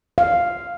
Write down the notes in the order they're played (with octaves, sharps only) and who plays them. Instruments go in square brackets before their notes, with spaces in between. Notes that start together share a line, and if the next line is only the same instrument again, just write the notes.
[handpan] F5